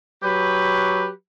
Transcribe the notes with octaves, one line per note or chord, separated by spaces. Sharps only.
F#3 G4 B4